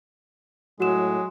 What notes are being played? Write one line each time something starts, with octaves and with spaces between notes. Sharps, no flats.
A2 F#3 G#3 F#4 E7